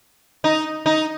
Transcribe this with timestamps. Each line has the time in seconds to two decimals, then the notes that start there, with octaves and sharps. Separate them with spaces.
0.44 D#4
0.86 D#4